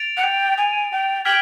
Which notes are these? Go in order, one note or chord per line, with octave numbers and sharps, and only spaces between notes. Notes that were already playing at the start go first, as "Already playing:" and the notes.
Already playing: A6 D7 F7
F#5
G5
G#5
G5
G5 F6 G#6 B6 D7 F#7